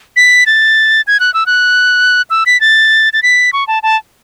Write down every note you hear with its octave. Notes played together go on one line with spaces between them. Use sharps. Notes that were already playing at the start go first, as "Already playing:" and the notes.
B6
A6
G#6
F#6
E6
F#6
E6
B6
A6
A6
B6
C#6
A5
A5